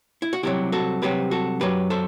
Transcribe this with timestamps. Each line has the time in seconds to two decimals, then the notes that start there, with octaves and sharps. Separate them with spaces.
0.22 E4
0.33 F#4
0.43 C2 C3 F#3 E4 G4
0.72 F#4 A4
1.02 C2 C3 F#3 G4 B4
1.31 F#4 A4
1.61 F#2 F#3 G4 B4
1.90 A4 C5